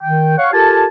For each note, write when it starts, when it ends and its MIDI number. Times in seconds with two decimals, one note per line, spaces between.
0.03 0.34 51
0.03 0.34 79
0.38 0.52 73
0.38 0.52 77
0.38 0.52 78
0.38 0.52 85
0.53 0.86 65
0.53 0.86 67
0.53 0.86 69
0.53 0.86 70
0.53 0.86 80
0.53 0.86 81